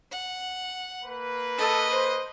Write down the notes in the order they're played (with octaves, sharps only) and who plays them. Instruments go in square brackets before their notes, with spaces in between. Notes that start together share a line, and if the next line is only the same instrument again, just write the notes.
[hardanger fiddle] F#5
[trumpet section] A#3 B4
[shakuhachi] A4 [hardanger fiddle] D#5
[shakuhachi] C5